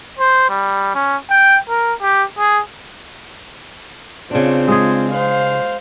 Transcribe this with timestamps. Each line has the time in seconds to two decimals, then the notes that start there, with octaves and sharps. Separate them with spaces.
0.19 C5
0.49 G3
0.95 C#4
1.30 G5
1.69 A#4
2.02 G4
2.39 G#4
4.31 C#3 C4 D4 F4
4.68 G#3 G#4
5.11 C5 F5